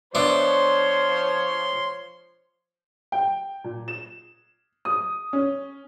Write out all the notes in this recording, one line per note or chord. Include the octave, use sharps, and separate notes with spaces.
F3 B3 D4 C5 C#5 E5 C6
G5
A#2
E7
D#6
C#4